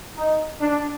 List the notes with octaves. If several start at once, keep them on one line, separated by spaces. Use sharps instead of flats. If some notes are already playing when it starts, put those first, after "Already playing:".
D#4
D4